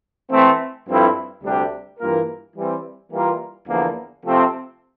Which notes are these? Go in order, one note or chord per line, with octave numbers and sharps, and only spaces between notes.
E3 A3 C4
G2 F3 C4 E4 A4
D2 C3 G3 D4 G4
G2 E3 A#3 F4 A#4
E3 G3 C4
E3 G3 A#3 F4 A#4
E2 D3 F3 A#3
C3 F3 A3 C4